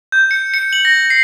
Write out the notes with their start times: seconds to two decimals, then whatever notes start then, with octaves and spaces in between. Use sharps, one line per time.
0.12 G6
0.31 C#7
0.54 C#7
0.73 F#7
0.85 A#6
1.10 C7